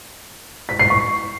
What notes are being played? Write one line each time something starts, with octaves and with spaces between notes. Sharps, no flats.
B6
C7
C#6